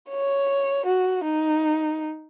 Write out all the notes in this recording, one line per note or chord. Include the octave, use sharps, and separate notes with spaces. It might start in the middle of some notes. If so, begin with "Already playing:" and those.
C#5
F#4
D#4